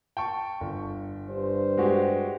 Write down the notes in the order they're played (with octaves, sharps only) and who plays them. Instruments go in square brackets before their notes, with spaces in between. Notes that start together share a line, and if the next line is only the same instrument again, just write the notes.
[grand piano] G5 A5 C#6
G1
[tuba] G2 [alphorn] C5
[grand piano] G#3 F#4 G4